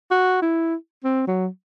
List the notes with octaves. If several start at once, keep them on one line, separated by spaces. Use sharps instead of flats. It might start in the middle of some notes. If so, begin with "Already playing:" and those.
F#4
E4
C4
F#3